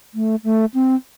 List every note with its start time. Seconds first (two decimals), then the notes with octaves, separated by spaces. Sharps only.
0.14 A3
0.44 A3
0.74 C4